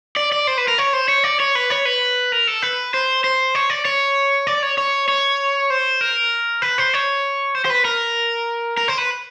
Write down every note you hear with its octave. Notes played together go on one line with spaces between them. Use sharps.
D5
D5
C5
B4
A#4
C#5
C5
C#5
D5
C#5
B4
C#5
B4
A#4
A4
B4
C5
C5
C#5
D5
C#5
D5
C#5
C#5
C#5
C5
A#4
B4
C5
C#5
C5
C5
B4
A#4
A#4
C5
B4